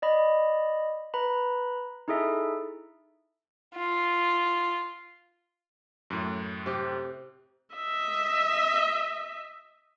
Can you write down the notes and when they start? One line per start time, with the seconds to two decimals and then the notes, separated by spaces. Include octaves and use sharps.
0.02 D5 D#5 B5
1.14 B4 A#5 B5
2.08 D#4 E4 G#4 A4 E5
3.75 F4
6.10 F#2 A2
6.66 C3 G4
7.75 D#5 E5